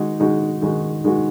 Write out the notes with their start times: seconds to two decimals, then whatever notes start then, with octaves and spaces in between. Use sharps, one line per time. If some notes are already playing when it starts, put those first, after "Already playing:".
Already playing: D#3 G#3 D#4 F#4
0.19 D#3 G#3 D#4 F#4
0.62 D#3 G#3 D#4 F#4
1.04 D#3 G#3 D#4 F#4